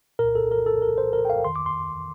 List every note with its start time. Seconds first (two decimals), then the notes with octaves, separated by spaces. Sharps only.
0.19 C2 A#2 A#4
0.35 A4
0.51 A#4
0.66 A4
0.82 A#4
0.98 C5
1.13 A#4
1.25 G5
1.30 F5
1.45 F2 D#3 C6
1.56 D6
1.66 C6